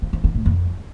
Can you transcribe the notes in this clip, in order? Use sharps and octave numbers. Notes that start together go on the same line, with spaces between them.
F3
F3
D3
A2
F2